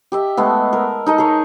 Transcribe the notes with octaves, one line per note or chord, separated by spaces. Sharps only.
G4 D#5 E5
G#3 A3 B3
A#4
D#4 A4 D#5
G#4 A#4 C#5